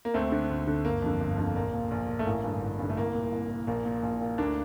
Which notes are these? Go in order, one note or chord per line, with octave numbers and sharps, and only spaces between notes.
A#3
D2 A3 C4
D3
D2
D3
G1 A#3
F2 D3
G1
F2 D3
A#1 A#3
A#2
A#1
A#2
A3
A1 A#3
G2 D3
A1
G2 D3
A3
C2 A#3
A#2
C2
A#2
A#1 A#3
A#2
A#1
A#2
D2 A#3 D4